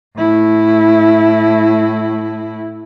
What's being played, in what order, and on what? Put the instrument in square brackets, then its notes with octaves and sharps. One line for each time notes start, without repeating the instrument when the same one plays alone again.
[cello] A2 E4